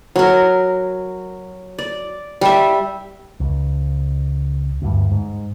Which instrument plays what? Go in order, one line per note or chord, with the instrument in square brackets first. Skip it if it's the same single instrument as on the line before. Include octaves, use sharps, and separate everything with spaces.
[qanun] F#3 A#4
D5
G3 E5
[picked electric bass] C#2
D2 G2
G#2